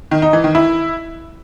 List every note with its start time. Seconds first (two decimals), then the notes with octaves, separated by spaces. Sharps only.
0.11 D#3
0.22 D#4
0.33 E3
0.44 D#3
0.55 E4